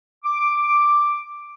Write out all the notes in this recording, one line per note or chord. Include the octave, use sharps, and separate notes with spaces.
D6